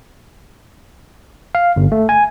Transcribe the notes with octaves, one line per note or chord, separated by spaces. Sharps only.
F5
G1
A3
G#5